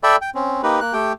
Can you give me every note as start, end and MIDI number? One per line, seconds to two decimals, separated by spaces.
0.03 0.16 69
0.03 0.16 74
0.03 0.16 76
0.03 0.16 79
0.03 0.16 83
0.21 0.30 79
0.35 0.62 60
0.35 0.62 61
0.63 0.80 58
0.63 0.80 63
0.63 0.80 67
0.63 0.80 71
0.81 0.93 58
0.81 0.93 90
0.93 1.13 57
0.93 1.13 67
0.93 1.13 79